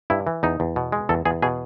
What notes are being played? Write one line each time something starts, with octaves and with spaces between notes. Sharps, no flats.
G2 E4
E3
E2 D#4
E2
B2
G#3
E2 A4
E2 G#4
B2 G#4